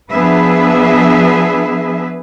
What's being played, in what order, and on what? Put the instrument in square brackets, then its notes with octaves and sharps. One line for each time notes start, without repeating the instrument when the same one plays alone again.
[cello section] F3 B3 D4 G#4 B4 E5